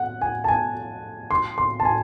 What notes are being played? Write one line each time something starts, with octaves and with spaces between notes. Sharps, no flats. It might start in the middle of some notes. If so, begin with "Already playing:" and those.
Already playing: F#5
G#5
A5
G#5
C6
C6
A5
G#5